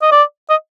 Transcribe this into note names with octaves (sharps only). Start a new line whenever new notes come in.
D#5
D5
D#5